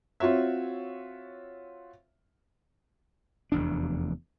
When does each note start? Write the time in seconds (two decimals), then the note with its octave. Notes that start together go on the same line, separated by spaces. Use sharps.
0.20 C4 F4 F#4 C#5 E5
3.52 F1 E2 D4